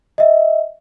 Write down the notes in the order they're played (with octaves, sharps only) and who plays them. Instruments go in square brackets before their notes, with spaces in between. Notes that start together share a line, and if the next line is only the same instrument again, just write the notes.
[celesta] D#5 E5